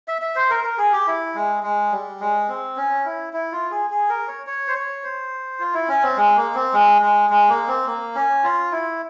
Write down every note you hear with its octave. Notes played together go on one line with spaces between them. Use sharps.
E5
E5
C5
A#4
A#4
G#4
G4
E4
G#3
G#3
G3
G#3
C4
C#4
E4
E4
F4
G#4
G#4
A#4
C#5
C#5
C5
C#5
C5
F4
E4
C#4
C4
G#3
A#3
C4
G#3
G#3
G#3
A#3
C4
A#3
C#4
F4
E4